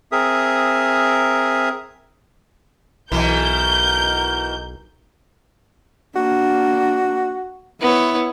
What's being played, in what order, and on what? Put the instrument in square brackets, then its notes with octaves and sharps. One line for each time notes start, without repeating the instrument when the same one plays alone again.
[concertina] C4 G#4 A#4 E5 D#6
[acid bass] B1 [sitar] B2 E3 [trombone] A#4 [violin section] G6
[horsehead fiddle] A#3 D4 [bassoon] F#4
[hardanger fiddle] B3 C#5 [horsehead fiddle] E4